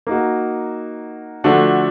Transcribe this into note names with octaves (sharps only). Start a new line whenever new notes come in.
A#3 D#4 F#4
D3 F3 A3 D4 F#4